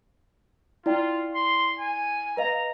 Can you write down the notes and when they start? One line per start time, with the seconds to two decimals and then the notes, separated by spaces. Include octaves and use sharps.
0.86 E4 F4 D5 G5
1.34 C6
1.79 G#5
2.37 B4 D#5 F5 A#5